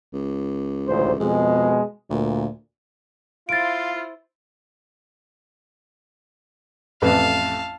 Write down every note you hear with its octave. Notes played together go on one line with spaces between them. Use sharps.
C#2
A1 D2 C5
F2 B2 G#3
D2 A#2
E4 F4 C5 F5 A6 D7
A1 F2 B4 F5 A5